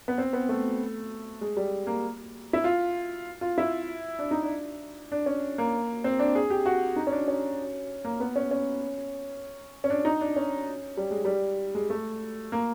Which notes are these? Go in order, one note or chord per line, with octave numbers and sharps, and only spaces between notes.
B3
C4
B3
A3
G#3
G3
A#3
E4
F4
F4
E4
D4
D#4
D4
D4
C#4
A#3
C4
D4
G#4
G4
F#4
D#4
C#4
D4
C#4
A#3
B3
C#4
C#4
C#4
D4
D#4
D4
C#4
G3
G#3
G3
G#3
A3
A#3